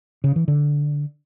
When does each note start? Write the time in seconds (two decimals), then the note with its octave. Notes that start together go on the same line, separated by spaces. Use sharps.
0.24 C#3
0.36 E3
0.48 D3